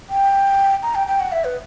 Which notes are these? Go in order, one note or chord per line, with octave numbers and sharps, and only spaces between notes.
G5
A#5
G5
G5
F#5
E5
B4